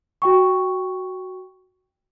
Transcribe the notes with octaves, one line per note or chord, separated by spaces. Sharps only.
F#4 G5 C#6